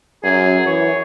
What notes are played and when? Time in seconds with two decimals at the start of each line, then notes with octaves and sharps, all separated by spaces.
0.24 F#2 G#4
0.66 E3 C#5